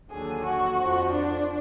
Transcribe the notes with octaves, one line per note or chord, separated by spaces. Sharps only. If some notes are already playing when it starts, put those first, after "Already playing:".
D#2 D3 F#3 G#4
F#4
F2 F3
D4